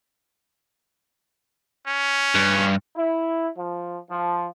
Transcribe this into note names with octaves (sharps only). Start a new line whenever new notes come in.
C#4
G2
E4
F3
F3